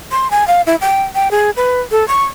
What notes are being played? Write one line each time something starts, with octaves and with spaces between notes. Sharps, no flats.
C6
G#5
F5
E4
G5
G5
G#4
B4
A4
C#6